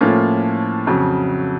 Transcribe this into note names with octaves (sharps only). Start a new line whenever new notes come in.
A2 F3 A#3 C#4 F4
F2 C#3 F#3